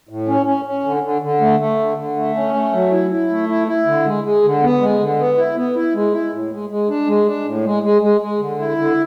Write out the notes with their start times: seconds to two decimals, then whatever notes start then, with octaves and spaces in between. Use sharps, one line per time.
0.09 A2
0.28 C#4
0.46 C#4
0.65 C#4
0.84 D3
1.03 D3
1.22 D3
1.41 A3
1.60 A3
1.79 D3
1.98 D3
2.17 A3
2.35 C#4
2.54 A3
2.73 F#3
2.92 E4
3.11 E4
3.30 A3
3.49 E4
3.67 E4
3.86 D3
4.05 G#3
4.24 G#3
4.43 D3
4.62 B3
4.81 G#3
5.00 D3
5.18 B3
5.38 E4
5.56 B3
5.75 E4
5.94 G#3
6.13 E4
6.32 A2
6.51 G#3
6.69 G#3
6.89 D4
7.07 G#3
7.26 D4
7.45 A2
7.64 G#3
7.83 G#3
8.02 G#3
8.21 G#3
8.39 D3
8.58 E4
8.77 D3